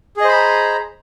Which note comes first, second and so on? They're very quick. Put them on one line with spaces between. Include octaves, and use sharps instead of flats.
G#4 D#5 C5 B5 A#5